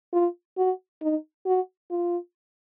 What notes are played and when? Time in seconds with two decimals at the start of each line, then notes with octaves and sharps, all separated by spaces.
0.13 F4
0.57 F#4
1.02 D#4
1.46 F#4
1.91 F4